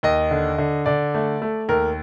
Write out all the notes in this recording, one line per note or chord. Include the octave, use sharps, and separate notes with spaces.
D#2 D#5
D3
D3
D3 D5
A3
A3
D#2 A#4